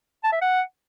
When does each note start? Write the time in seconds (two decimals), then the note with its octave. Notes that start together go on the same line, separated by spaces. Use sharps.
0.24 A5
0.32 E5
0.41 F#5